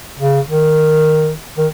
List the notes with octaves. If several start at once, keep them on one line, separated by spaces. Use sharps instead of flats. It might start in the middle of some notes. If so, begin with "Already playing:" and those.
C#3
D#3
D#3